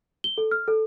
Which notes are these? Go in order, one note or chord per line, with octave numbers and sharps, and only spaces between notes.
G7
A4
F6
A4